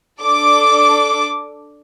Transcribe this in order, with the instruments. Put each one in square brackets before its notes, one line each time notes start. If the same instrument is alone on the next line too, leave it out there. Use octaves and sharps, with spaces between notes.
[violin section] D4 A4 D6